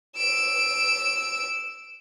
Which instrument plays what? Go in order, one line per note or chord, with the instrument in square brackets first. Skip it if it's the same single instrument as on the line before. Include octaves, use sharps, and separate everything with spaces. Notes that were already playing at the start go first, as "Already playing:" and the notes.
[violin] E6 D7